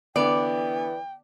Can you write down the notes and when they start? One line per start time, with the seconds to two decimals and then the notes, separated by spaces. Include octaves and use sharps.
0.16 D3 E3 B3 D5 G5